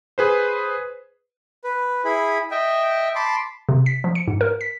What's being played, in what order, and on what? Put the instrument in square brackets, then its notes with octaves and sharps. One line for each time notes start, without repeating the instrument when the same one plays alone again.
[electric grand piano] G#4 B4 C5
[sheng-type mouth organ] B4
E4 G#4 B5
D#5 E5 G5
A5 B5 C6 D6
[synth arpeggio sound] C3
B6
F3
C#7
G#2
A#4
B6